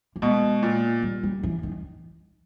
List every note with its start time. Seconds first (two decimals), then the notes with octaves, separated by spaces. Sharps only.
0.16 A#3
0.22 B2 G#3
0.63 A#2
1.02 G3
1.23 G3
1.43 E3
1.63 D#3